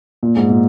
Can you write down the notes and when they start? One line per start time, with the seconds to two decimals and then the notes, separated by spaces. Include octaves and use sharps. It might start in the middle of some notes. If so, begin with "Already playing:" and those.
0.23 A#2
0.36 G#2
0.50 A#2